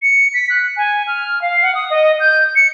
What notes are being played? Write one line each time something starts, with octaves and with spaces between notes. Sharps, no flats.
C#7
B6
F#6
G#5
F6
F5
F#5
D#6
D#5
G6
C#7